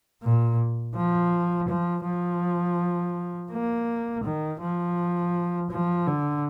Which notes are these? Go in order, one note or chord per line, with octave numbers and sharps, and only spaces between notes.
A#2
F3
F3
F3
A#3
D#3
F3
F3
D3